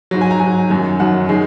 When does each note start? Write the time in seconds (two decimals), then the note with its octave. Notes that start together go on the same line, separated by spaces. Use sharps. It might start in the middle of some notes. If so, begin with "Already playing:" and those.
0.11 G#2 F#3
0.21 G#5
0.31 A#5
0.40 G#2 F#3 G#5
0.70 F#2 D#3 F#3
1.00 F#2 D#3 F#3 F#5
1.29 D#3 G#3